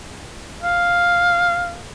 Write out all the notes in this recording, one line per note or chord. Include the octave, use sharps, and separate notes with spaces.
F5